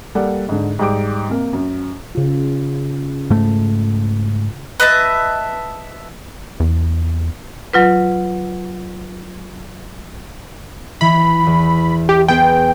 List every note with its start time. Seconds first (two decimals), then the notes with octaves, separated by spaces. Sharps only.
0.15 G3 A#3 A4 D5 F#5
0.49 G#2 D3
0.79 G#2 G3 G5 D6 D7
1.29 C3 A#3
1.53 F#2
2.15 C#3 F4
3.30 G#2 A3
4.80 B4 D#5 E5 A5
6.60 E2
7.73 F#3 F4 B4
11.01 E3 B5
11.46 E2
12.09 G4
12.28 B3 G#4 C5 G5